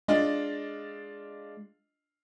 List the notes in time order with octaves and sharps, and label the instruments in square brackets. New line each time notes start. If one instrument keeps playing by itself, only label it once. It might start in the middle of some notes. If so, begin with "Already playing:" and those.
[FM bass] G#3 [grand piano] D4 F4 D#5